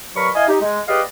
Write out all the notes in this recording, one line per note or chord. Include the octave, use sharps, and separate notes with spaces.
G2 F#3 A#4 B5 C#6
E4 D#5 F5 G#5
D#4 G4
G#3
G4 G#4 B4 D5 D#5 F5